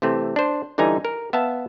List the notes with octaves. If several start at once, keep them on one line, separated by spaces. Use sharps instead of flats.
C3 E3 A3 C4
D4 C5
D3 E3 G3 D#4 G#5 A#5
A#4
B3 E5 F5 A5